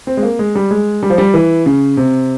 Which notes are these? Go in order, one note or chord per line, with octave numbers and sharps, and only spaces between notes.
C4
G#3
A#3
G#3
G3
G#3
G3
F3
G3
E3
C#3
C3